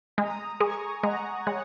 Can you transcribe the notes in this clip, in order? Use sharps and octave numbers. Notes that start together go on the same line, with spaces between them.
G#3 A#5 D#6
G#3 G#5 C#6
G#3 F#5 A#5
G#3 C#5 F#5